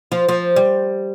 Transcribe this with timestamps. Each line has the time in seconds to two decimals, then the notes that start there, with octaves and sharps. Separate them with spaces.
0.12 F3
0.29 F3
0.56 G3